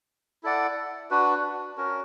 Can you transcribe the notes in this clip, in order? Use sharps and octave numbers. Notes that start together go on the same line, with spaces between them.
E4 A4 D5 F#5
D4 F#4 B4
C#4 F#4 A#4